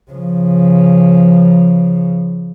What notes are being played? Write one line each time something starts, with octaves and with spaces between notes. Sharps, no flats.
C#3 F3